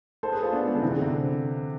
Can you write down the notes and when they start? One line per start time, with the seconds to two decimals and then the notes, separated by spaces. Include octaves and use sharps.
0.23 A4 C5
0.32 G#4 B4
0.43 F4 A4
0.53 B3 D4
0.67 G#3 B3
0.75 D3
0.82 C3 E3
0.92 D3
1.02 C3